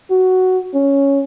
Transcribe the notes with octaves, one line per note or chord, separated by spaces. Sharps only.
F#4
C#4